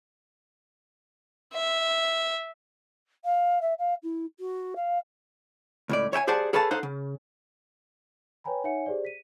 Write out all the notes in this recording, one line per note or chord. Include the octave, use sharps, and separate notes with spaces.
E5
F5
E5
F5
E4
F#4
F5
C#2 A2 D5
C#5 E5 G5 G#5
G4 G#4 C5 D5 F#5 A5
G#4 A4 B4 C#5 F5 A5
D#4 A4 C5 F5 F#5
C#3
B4 C#5 G5 G#5 A#5 B5
D#4 C#5 E5 F#5 G#5 C#7
G4 G#4 C5 D5
B6 D#7